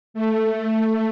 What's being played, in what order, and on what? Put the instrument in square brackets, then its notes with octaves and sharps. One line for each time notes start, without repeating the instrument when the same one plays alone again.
[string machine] A3